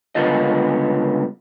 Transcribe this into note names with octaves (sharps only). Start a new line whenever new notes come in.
C#2 D3 G3 B3 F4 D#5